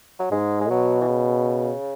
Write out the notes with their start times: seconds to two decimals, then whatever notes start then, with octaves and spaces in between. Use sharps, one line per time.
0.19 F#3
0.31 G#2 G#3
0.61 G#3
0.69 B2 F#3
1.01 E3
1.08 C#3